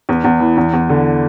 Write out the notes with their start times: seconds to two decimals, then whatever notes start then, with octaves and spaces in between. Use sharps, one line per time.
0.09 E2
0.24 E2
0.40 E3
0.57 E2
0.73 E2
0.89 D3